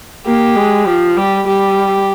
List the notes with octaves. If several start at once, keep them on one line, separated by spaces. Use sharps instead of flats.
A#3 G4
G#3
F3
G3 G4
G3 G4